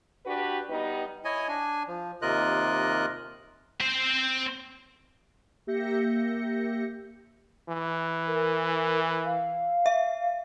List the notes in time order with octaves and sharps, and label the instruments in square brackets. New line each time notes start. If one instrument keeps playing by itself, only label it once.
[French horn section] D4 F#4 G4 B4
G3 B3 D#4 B4
[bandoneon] E4 C#5 D#5 G#5
D4 G#5
F3
D#2 C3 F4 A#4 D#5 F#6
[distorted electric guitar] C4 C5
[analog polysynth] A#3 G4 E5 G6 A#6 C#7
[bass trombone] E3
[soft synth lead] A#4
F5
[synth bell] E5